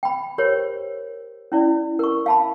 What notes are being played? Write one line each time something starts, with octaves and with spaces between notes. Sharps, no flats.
G5 B5
G4 A#4 C5 C#5
C#4 E4 D5
A#4 C#6
F5 A5 B5